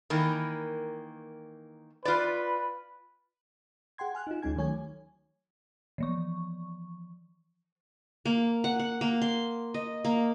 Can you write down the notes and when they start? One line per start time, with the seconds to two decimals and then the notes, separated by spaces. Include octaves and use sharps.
0.10 D#3 E3 A#3
2.05 F4 B4 D5
3.98 G#4 F#5 G5 C6 G#6
4.15 G#5 F6 F#6
4.27 D#4 F4
4.42 D2 G#3 C#4 D#4 G#5 G#6
4.56 D#3 F#3 A3 C#5 G#5 G#6
5.98 E3 F3 C#6
8.25 A#3
8.64 F#5
8.80 F#5
9.01 A#3
9.22 C6
9.74 D#5
10.05 A#3